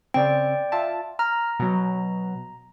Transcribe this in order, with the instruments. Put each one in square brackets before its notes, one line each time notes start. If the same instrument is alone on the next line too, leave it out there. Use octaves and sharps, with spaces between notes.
[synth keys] C#3 C4 [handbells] D5 G5
[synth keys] F4 E5 A5
[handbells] A#5 [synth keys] F6
[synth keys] B2 F#3